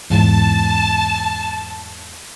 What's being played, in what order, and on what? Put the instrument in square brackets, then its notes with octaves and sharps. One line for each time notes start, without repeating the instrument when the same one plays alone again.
[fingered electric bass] E2 G#2 [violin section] A5